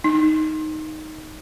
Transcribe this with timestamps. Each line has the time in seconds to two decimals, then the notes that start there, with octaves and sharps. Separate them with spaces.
0.04 D#4